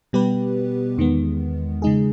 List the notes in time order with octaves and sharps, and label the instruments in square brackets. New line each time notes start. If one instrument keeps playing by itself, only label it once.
[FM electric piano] B2 G3 B3 G4 B4
E2 D#3 G#3 B3
C#3 G#3 D#4 G#4